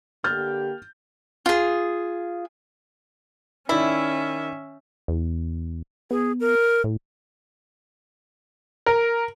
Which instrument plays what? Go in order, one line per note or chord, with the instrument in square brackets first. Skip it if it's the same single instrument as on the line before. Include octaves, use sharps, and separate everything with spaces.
[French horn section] D3 A#3 G4 [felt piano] F6 G6 A6
[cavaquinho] F4 G#4
[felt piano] D#3 D5 [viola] C#4 E5 [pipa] E4
[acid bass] E2
[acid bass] B3 [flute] G#4
[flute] A#4
[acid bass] A2
[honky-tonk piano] A#4